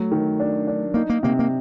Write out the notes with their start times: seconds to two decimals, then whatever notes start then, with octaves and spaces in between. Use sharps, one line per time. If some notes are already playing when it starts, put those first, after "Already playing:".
Already playing: F#3 A3
0.12 D#3
0.40 D4
0.67 D4
0.94 A#3 D#4
1.10 A#3
1.23 C3 A#3
1.39 A#3